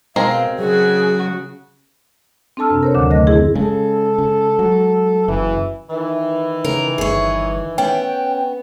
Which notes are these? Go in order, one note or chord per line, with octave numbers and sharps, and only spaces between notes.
B2 G#3 C4 A#4 F5
C#3 F#3 F#4 G#4
C4 D4 A4 A5 E6 F6
F#2 C3 D4
A#4 C5 C#5
D2 D3 D#3 F#3 D6
F2 D3 A3 D#5 A#6
C4 E4 G#4
C#3 G#3 A4
C#3
F#3
F#1 E3
D#3 E3
C#3 A#4
G1 G#4 C#5
B3 C#4 G5